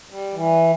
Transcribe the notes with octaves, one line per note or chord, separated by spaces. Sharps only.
G3
E3